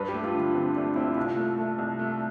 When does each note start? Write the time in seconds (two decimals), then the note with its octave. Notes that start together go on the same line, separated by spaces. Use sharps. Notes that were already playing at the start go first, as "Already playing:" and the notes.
Already playing: G2 B4
0.08 G4
0.14 A3
0.24 F4
0.34 D3
0.55 D3 C4
0.76 A3 D4
0.96 C4 E4
1.16 C2 F4
1.37 A3
1.58 A3
1.78 C2
1.99 A3